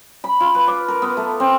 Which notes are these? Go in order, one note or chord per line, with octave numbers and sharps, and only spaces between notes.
B5
F4
B4
D6
A#4
B3
A3
C4